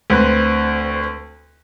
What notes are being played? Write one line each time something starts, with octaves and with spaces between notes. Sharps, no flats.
D2 C4 B4